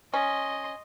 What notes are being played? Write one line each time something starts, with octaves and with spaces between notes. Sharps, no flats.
C#4 D#5 C6